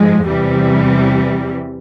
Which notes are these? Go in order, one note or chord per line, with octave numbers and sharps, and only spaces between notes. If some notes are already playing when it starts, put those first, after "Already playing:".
Already playing: G#2 F3 G#3
E2 C3 E3 G3